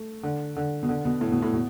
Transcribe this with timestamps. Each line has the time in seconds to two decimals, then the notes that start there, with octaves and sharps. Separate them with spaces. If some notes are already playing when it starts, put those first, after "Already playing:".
Already playing: A3
0.23 D3
0.56 D3
0.83 B2
0.89 D3
1.05 B2
1.21 A2
1.31 B2
1.42 A2
1.53 B2